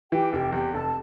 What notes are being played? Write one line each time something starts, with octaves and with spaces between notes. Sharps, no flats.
E3 G4 G5
F1 G4 G5
E2 G4 G5
F1 A4 A5